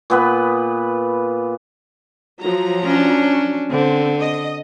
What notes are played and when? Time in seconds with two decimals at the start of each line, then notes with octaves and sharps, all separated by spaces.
0.10 A#2 B3 B4
2.42 F3 F#3 A#5
2.84 C#4 D4
3.71 D3 C4
4.21 D#5